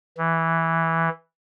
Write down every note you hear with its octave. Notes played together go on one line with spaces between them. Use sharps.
E3